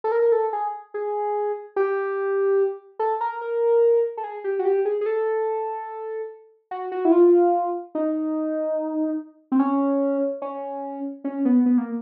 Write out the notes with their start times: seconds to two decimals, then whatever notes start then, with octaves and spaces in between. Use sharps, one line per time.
0.04 A4
0.12 A#4
0.22 A#4
0.32 A4
0.53 G#4
0.94 G#4
1.76 G4
2.99 A4
3.21 A#4
3.41 A#4
4.17 A4
4.24 G#4
4.44 G4
4.59 F#4
4.65 G4
4.85 G#4
5.01 G#4
5.06 A4
6.71 F#4
6.92 F#4
7.05 E4
7.12 F4
7.95 D#4
9.52 C4
9.59 C#4
10.42 C#4
11.24 C#4
11.45 B3
11.66 B3
11.78 A#3